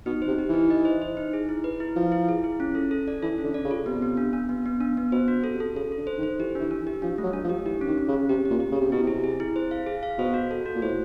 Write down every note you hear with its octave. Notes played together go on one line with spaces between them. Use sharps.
B2 D#4
C5
C3
G4
E3 D#4
D#5
C5
C5
D#4
G#4
E4
B4
E4
F3 E4
E4
G#4
E4
C#4
A4
A4
D5
E3 A4
C#4
D3
D5
C#3
F4
C3 B3
B3
D4
D4
B3
B3
D4
B3
B2 C5
F#4
A4
C3
A4
C#3 A4
D3 A4
C5
D#3
C5
E3 G4
E3 D4
D4
E3
G4
F3 D4
A3
F#3
D4
F3
G4
E3 G4
C#4
D#3
C#4
C#3
C#4
C3 G4
A#2 G4
G4
C#3 G4
C3
B2 E4
C3 G#4
G#4
E4
C5
F5
G#4
F5
B2 C5
F#4
A4
F#4
A#2
A2 C5